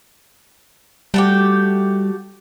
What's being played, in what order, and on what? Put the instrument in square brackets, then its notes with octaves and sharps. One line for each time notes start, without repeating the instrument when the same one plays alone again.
[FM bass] G3 [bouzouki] A3 F#4 G4